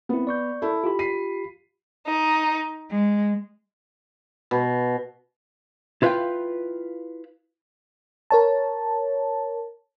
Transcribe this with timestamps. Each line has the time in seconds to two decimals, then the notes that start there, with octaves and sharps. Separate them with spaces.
0.09 B3 C4 E4
0.27 D5 C#6 G6
0.62 E4 A4
0.84 F4 G4 B5
0.99 B6 C7 D#7
2.07 D#4
2.91 G#3
4.51 B2
6.02 E4 F4 B4 C#5 F5 G5
8.30 A#4 C#5 A5